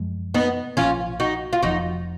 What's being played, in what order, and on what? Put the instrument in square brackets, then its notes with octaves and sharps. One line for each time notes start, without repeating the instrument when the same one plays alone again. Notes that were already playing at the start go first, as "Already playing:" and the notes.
Already playing: [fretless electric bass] F#2 F3 G#3
[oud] B3 D#4
[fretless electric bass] A#1 A#2 F3 [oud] C#4 F4
[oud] D#4 F#4
F4
[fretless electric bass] F1 F2 F3 [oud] D#4 F#4